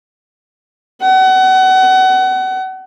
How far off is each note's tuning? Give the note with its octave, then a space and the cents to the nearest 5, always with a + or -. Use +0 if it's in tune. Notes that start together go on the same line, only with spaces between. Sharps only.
F#5 +30